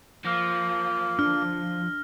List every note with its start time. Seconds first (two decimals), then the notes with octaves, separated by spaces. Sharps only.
0.25 F3 A#3 F6 A#6
1.19 D4 F6